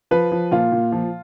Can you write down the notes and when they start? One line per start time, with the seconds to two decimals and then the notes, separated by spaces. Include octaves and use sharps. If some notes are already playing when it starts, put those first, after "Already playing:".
0.11 F3 B4
0.32 F3
0.52 A#2 F4
0.72 A#2
0.92 F3